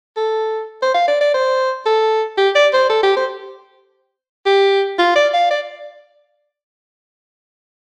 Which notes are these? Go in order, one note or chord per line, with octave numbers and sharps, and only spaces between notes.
A4
C5
F5
D5
D5
C5
A4
G4
D5
C5
A4
G4
C5
G4
F4
D5
F5
D5